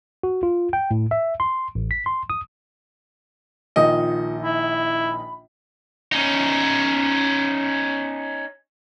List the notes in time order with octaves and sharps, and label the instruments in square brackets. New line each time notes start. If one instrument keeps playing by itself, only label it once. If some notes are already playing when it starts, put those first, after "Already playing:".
[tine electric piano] F#4
F4
G5
A2
E5
C6
A1
B6
C6
D#6
[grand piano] A#1 D#3 [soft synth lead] F4 [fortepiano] D#5
[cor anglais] E4 [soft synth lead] B5
[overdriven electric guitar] C#4 D#4